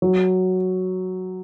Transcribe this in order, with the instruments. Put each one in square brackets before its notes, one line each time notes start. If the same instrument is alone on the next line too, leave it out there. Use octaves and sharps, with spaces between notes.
[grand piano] F#3